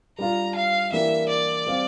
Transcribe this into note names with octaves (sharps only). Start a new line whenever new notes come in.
G3 D4 F4 A#5
F5
E3 A#3 D4 G4 A#4 E5
D5
G3 C4 G4 C5 F5